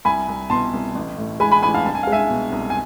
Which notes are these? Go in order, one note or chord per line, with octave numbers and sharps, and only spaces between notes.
C2 G#5 B5
C2
B2 A5 C6
C2
A1
A2
G#3 G#5 B5
G#5 B5
A1 G#5 B5
F5 A5
C2 A5
G#5
G#3 F5
E5 G#5
B2
C2
G#5